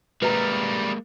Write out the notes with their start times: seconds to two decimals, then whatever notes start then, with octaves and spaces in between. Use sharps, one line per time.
0.22 G3 G#3 A#3 A#4 B4 A#5